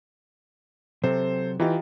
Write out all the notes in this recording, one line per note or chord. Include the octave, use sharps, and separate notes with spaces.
C3 F#3 C4 A4 C5
E3 D#4 F4 G4